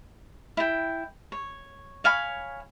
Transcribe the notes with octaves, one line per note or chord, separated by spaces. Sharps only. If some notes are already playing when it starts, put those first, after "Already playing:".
E4 G5
C#5
C#5 F5 G#5 B5